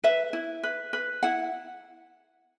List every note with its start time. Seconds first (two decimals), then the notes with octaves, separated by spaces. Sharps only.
0.04 B4 E5
0.33 E4
0.63 B4
0.93 B4
1.23 E4 F#5